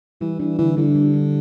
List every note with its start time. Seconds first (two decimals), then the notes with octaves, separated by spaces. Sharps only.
0.21 E3 G3
0.39 E3 D4
0.58 D3 E3
0.77 D3 G3
0.95 G3
1.14 G3